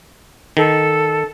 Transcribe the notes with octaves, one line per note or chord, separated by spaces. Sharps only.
D#3 A4